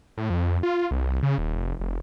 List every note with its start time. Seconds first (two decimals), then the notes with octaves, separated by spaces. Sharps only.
0.18 A2
0.30 F2
0.63 F4
0.91 C2
1.23 C#3
1.38 D#1
1.56 F1
1.80 F1